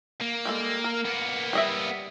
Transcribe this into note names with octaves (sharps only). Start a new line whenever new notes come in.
A#3
G3 G#3 A4
A#4
A#3 B3
G3 D#5 E5